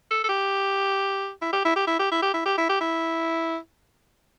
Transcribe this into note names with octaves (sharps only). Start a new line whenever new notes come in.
A4
A4
G4
E4
G4
E4
G4
E4
G4
E4
G4
E4
G4
E4
G4
E4